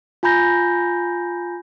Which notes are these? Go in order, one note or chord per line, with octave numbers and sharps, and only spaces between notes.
F4 G#5 A#5 B5 G6 A#6